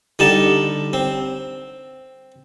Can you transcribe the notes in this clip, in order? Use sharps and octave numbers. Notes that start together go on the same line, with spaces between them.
D3 G3 D#4 A5
C4